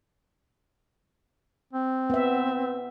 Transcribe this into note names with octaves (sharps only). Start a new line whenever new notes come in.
C4
B3 E5